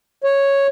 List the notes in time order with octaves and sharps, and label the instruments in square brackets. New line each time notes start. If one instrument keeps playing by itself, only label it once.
[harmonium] C#5